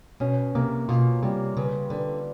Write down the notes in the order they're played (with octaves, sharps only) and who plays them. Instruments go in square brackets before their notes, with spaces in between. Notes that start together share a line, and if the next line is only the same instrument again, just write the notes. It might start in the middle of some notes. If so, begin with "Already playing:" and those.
[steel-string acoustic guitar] B2 [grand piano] C#4
[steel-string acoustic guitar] C3 [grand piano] A#3
[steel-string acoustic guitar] B2 [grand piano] F4
[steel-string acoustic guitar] C3 [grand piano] G3
[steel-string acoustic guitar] C#3 [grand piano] B4
[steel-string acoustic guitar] D3 [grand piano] B4